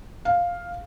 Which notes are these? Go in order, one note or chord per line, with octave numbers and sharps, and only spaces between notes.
F5